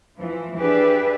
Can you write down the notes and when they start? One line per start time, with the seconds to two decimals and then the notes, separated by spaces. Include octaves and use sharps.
0.17 E3 F3
0.57 D4 G4 G#4 B4 D5 E5